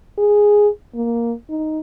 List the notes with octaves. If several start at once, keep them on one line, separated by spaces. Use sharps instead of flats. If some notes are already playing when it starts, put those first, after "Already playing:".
G#4
A#3
D#4